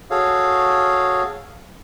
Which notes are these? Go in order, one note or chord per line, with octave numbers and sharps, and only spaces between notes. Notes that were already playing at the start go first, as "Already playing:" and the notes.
F#4 G#4 A4 C#5 F5